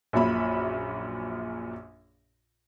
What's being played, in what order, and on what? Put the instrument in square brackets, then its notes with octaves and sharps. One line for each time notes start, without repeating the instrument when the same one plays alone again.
[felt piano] A#1 F#2 A#2 E5 B5